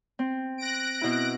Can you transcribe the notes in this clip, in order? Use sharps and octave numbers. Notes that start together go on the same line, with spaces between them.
C4
F#6 A#6 D7
B2 E4